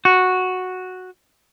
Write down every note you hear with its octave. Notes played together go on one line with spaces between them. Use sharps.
F#4